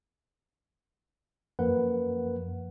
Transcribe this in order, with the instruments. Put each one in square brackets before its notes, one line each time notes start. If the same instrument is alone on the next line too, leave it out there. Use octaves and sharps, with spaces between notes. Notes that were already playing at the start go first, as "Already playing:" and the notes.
[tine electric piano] F#2 F3 A#3 A#4 B4 F#5